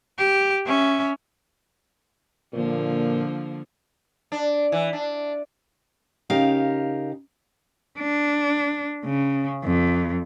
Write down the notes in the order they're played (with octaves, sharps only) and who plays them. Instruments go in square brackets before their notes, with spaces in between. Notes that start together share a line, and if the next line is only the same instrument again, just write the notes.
[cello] G4
C#4 E5
[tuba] A#2 [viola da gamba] D3 F3 A#3
[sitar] D4
E3
D4
[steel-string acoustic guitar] C#3 D#4 G4 A#4 F5
[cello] D4
C#3
F2